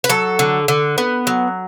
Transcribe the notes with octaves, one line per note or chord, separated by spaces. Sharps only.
B4
F#3 A4
D3
D3
B3
F#3